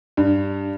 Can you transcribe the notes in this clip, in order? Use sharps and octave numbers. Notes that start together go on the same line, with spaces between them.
G2